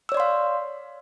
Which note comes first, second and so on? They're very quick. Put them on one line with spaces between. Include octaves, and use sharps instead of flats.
E6 C#5 D5 C6 F5